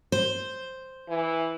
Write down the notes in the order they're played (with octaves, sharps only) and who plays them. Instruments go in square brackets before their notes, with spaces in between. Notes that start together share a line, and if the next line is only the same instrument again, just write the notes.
[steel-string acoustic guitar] C5
[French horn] E3